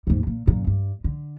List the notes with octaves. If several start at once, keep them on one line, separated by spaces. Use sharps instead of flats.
D#2 G#2
A#2
F#2 A#2
G2
D3